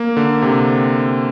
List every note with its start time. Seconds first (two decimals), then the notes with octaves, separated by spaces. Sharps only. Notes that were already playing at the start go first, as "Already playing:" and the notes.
Already playing: A#3
0.17 D3
0.42 C3